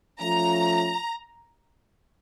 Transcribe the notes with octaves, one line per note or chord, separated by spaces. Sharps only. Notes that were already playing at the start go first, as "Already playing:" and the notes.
F3 A3 C#4 F4 A#5